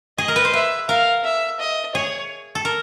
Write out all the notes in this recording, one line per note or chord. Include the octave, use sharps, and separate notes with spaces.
G#4 D#5
A#4
B4
C5
B4 E5
A#4 F5
E5
D#5
G#4 C#5
A4
A#4